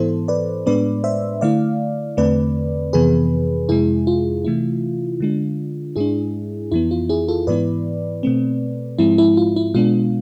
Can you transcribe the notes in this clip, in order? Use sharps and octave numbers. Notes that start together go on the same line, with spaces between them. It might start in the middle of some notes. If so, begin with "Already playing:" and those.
Already playing: G#2 E3 B3 E4 A4 C5
B4 D5
A2 G#3 B3 D4 B4 D5
C5 E5
D3 A3 E4 D5 F5
E2 D3 A3 C4 B4 D5
F2 C3 E3 B3 G#4 B4
F2 C3 G#3 E4 G#4
F4
C3 E3 A3 E4
D3 G#3 D4
G#2 G#3 D4 E4 G#4
F2 E3 B3 E4
F4
E4 G#4
F4 A4
G#2 E3 B3 E4 B4 D5
B2 A3 C4
G#2 F3 G#3 C4 E4
E4
F4
E4
B2 G#3 B3 D4 F4